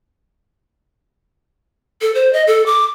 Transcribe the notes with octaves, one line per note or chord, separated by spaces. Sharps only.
A4
C5
D#5
A4
D6